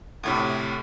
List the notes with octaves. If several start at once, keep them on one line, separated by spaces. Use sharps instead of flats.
D2 A2 C3